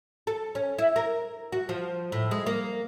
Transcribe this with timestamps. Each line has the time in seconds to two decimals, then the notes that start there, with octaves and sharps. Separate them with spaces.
0.27 A4
0.55 C#4
0.78 E4
0.96 A#4
1.52 F#4
1.69 F3
2.12 A2
2.31 G#3
2.46 A#3